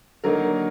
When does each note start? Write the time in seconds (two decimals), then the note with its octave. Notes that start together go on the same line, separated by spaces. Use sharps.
0.24 D3 F#3 A#3 D#4 A#4